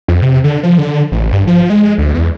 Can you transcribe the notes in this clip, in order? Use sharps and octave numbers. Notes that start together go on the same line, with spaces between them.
F2
C3
D3
F3
D3
A1
G2
F3
G#3
D2
E2